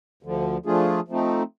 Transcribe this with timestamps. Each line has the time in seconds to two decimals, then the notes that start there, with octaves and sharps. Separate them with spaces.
0.23 D2 D3 F3
0.66 F3 A3 D4 F4 G#4
1.08 F3 A3 C4 D#4